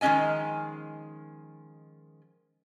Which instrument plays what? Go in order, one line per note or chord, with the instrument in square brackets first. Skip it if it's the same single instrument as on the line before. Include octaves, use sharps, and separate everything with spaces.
[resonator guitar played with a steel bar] D#3 F3 G#3 C#4 D#5 G#5